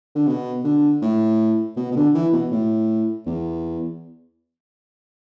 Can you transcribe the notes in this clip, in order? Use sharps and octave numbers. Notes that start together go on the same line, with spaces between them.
D3
B2
D3
A2
B2
B2
D3
E3
B2
A2
E2